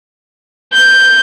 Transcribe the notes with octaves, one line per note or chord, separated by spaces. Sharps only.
G6